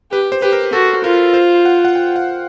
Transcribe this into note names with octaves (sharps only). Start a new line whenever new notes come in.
G4 B4
C5
G4 B4
A#4
F#4 A4
F4 A#4
C5
F#5
F#5
G5
F5